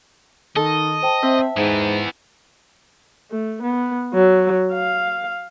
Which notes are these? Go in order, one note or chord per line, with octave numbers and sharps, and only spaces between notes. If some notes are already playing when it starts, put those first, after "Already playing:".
D#3 A4 D#5
C5 G5 A5
C4 E5
G#2 E3 B3
A3
B3
F#3
F5